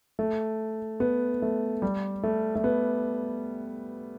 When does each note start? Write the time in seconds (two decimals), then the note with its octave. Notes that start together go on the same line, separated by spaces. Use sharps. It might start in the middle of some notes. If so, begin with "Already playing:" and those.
0.19 A3
1.00 B3
1.42 A3
1.82 G3
2.23 A3
2.55 A3
2.64 B3